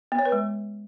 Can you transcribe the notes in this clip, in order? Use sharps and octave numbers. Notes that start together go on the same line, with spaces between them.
B3
C#5
B4
G#3